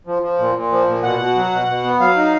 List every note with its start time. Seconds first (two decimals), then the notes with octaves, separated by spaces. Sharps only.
0.07 F3
0.22 F3
0.39 A#2
0.55 A#2
0.72 F3
0.87 A#2
1.03 B2 F#5
1.19 B2
1.36 F#3
1.52 B2
1.68 B2
1.84 B3
2.00 F#3 F5
2.17 D#4